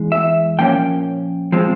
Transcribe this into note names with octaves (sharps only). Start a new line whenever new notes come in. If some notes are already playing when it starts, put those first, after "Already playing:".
Already playing: E2 E3 G#3
E5
A#2 F3 A#3 C#4 G5
F3 G#3 C4